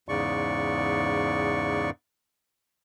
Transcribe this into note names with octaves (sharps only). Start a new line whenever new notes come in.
E2 G#2 C#3 D5 C#6